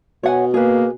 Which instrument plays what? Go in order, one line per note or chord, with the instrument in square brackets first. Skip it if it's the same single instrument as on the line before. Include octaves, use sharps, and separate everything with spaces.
[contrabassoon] B2 [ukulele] C#5 F#5 G#5
[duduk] A#3 [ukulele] G#4 B4